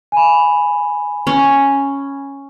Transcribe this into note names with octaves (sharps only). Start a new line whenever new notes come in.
G#5 B5
C#4